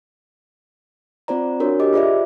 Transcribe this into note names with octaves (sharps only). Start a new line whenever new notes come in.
C4 F4 C5 D5 A#5
D4 F#4 A#4 C#5
G4 D#5 D6
F4 G#4 C5 D5 E5